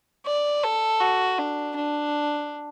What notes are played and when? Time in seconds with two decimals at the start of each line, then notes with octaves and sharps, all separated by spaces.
0.26 D5
0.64 A4
1.01 F#4
1.38 D4
1.76 D4